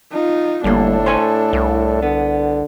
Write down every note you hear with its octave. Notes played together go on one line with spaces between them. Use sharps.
D#4 F4
G1 A2 G3 A#3 D4 A4
C5 C#5 G#5
C2
D3 B3